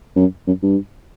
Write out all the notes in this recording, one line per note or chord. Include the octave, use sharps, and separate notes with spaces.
F#2
F#2
G2